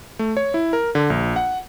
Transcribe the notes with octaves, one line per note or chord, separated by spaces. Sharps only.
A3
C#5
E4
A#4
D3
A#1
F#5